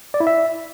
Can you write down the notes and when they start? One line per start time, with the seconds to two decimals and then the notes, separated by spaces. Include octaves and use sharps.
0.14 D5
0.20 E4
0.27 E5